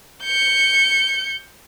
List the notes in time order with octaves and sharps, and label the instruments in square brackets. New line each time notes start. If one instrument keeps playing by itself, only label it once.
[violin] G6 C#7